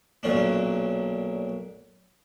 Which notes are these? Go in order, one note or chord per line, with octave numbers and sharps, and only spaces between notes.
B1 A#2 C#4 D4